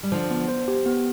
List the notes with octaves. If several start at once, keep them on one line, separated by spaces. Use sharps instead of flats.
G3
D3 F3 C5
B3
C5
G4
B3